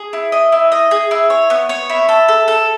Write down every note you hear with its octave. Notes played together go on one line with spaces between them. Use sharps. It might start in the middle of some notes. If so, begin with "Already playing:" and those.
Already playing: G#4
E4
D#5
E4
D#5
G#4
E4
C#5
B3
C#5
E4
A4
A4
A4